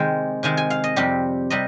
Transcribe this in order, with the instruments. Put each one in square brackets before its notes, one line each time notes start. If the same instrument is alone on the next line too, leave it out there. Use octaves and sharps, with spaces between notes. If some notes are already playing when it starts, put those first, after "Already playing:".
Already playing: [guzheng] C3 D#3 G#3 G5
C3 D#3 G#3 G#5
G#5
F5
D#5
F2 C3 G3 G4
C3 G3 D#5